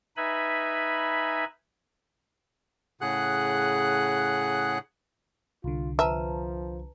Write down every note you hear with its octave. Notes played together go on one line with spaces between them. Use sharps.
D#4 B4 E5 G#5 B5
A2 C#3 G#4 F#5 F#6
C2 D3 F4
F3 B4 E5 A5 A#5